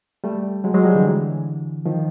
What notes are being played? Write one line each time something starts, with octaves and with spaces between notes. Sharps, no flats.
G3 A3
F#3 G#3
F#3 G#3
F3 G3
D3 E3
D#3 F3